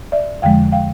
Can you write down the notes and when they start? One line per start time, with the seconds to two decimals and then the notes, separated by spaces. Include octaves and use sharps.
0.12 D5 E5
0.42 F2 D3 F3 G#3 F5 G5
0.72 F5 G5